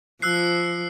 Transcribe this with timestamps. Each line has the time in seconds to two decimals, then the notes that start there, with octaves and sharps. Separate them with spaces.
0.22 F3 E6 F#6 C7